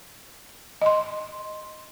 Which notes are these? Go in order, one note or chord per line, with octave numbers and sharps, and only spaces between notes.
D#5 C6